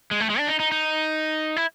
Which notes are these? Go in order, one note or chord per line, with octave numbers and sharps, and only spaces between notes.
G#3
A3
G#3
D4
D#4
D#4
D#4
E4